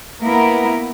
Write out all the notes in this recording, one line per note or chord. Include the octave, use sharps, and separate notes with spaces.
A#3 B3 E4 A#4